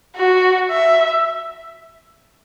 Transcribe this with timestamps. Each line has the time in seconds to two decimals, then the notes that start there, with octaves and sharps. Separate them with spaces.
0.16 F#4
0.71 E5